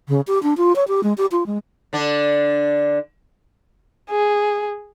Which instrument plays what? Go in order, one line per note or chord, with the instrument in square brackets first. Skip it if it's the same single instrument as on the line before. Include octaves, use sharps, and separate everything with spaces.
[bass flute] C#3
G4
D4
F4
C#5
G4
G#3
G4
F4
G#3
[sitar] D3 D4
[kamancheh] G#4